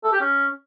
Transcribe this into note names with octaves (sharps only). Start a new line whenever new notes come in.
A4
G4
C#4